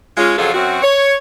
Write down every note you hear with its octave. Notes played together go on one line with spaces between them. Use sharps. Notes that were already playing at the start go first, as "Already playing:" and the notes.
G#3 C#4 F4
F2 C#3 F#3 F4 G#4 A4
F#2 C4 F#4
C#5